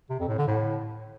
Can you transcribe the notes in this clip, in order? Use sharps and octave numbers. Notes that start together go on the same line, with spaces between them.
C3
F2
A2
D3
A2